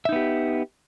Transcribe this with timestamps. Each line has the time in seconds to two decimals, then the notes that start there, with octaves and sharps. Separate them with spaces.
0.05 E5
0.09 D#4
0.12 B3
0.16 G4